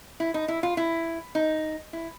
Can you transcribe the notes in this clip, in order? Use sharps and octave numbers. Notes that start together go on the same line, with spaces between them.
E4
D#4
E4
F4
E4
D#4
E4